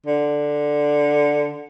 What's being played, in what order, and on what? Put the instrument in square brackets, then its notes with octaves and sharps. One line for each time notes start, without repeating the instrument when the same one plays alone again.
[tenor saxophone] D3